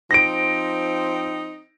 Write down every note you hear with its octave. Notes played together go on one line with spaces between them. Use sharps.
F3 C4 D#4 A#6 D7